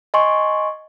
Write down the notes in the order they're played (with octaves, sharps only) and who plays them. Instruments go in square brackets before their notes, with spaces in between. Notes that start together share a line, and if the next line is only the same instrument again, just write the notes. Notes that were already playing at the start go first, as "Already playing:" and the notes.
[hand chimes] D#5 G#5 C6 C#6